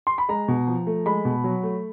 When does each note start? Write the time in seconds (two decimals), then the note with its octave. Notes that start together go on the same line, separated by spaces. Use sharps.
0.07 C6
0.18 B5
0.29 G#3 A#5
0.48 B2
0.67 F3
0.87 A3
1.06 G#3 B5
1.25 B2
1.44 F#3
1.63 A3